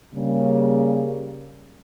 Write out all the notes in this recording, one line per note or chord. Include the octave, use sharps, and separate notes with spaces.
C#3 G3 A#3